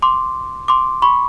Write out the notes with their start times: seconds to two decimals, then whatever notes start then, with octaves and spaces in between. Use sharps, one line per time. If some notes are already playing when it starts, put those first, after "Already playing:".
0.02 C6 D6
0.68 C6 D6
1.02 B5 C#6